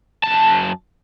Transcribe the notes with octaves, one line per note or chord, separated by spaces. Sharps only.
F#2 A5